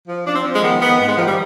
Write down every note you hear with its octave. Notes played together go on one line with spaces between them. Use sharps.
F3
F3 D4
C4
F3
G#3
D#3 B3
D#3 B3
G#2 B3
G#3
D#3 F3
G3